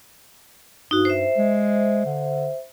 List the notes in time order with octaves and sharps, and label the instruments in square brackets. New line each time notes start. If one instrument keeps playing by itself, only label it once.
[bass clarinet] G2 [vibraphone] D#4 F#4
[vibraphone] C5 E5
[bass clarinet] G#3
D3